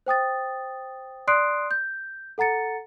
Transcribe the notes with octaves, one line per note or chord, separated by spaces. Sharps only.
C5 G5 D#6 A6
D5 C6 D#6 F#6 C7 D7
G6
A4 F#5 A#5 A6 C#7